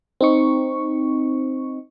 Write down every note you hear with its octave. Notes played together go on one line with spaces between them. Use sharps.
C4 D#4 C#6